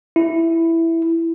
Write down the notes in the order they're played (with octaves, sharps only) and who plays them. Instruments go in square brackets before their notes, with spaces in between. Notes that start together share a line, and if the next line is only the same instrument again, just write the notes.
[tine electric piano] E4